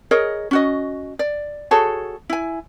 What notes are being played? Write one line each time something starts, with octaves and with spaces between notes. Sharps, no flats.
G#4 A#4 C#5 D#5
C#4 F#4 D#5
D5
F#4 G#4 A4 C#5
E4 G#5